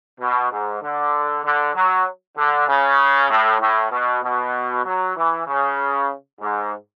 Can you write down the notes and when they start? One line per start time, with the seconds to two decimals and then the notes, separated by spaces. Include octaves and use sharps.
0.20 B2
0.51 G#2
0.82 D3
1.44 D3
1.75 F#3
2.37 D3
2.67 C#3
3.30 A2
3.60 A2
3.92 B2
4.23 B2
4.85 F#3
5.16 E3
5.47 C#3
6.40 G#2